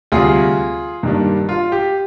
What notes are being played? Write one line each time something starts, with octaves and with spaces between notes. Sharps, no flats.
D2 C3 G3 F4 G#4
G2 D#3 G3 A#3 D4
F4
G4